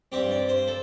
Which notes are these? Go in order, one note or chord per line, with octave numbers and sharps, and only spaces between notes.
G2 G3 C4 G4
D5
C5
A4